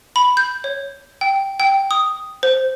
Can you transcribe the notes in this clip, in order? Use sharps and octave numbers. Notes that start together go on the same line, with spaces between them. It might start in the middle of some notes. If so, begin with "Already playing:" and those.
B5
G6
C#5
G5
G5
D#6
C5